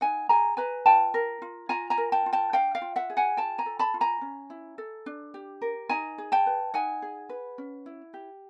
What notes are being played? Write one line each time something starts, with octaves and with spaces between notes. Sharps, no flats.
D#4 F#5 G#5
G#4 G#5 A#5
B4 G#5 A#5
F4 G5 A5
A#4
F4
F4 G#5 A#5
G#5 A#5
A#4
G5 A5
F4
G5 A5
D4 F5 G5
F5 G5
F4
E5 F#5
G#4
F#5 G#5
F4 G5 A5
G#5 A#5
A4
A5 B5
F4
G#5 A#5
C#4
E4
A4
D4
G4
A#4
D#4 G#5 A#5
G#4
G5 A5
B4
D#4 F#5 G#5
G#4
B4
C#4
E4
G4